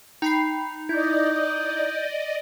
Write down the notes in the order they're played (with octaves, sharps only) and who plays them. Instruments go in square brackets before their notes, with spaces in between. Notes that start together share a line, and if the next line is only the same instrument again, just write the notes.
[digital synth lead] D#4 [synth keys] G5 B5 C7
[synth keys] E4 [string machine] D5 D#5 [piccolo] G6